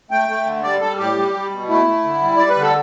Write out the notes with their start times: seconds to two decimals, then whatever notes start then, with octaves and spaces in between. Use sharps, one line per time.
0.11 A3 G5
0.28 A3
0.46 D3
0.63 G3 D5
0.81 G3 A4
0.98 A2 G4
1.16 G3
1.33 G3
1.51 B2
1.69 A3 E4
1.86 A3
2.04 D3
2.22 G3
2.37 G3 D5
2.50 B4
2.56 D3
2.62 A4